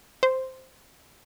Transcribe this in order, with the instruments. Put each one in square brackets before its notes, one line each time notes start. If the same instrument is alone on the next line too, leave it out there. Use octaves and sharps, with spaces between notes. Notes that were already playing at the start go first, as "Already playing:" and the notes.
[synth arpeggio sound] C5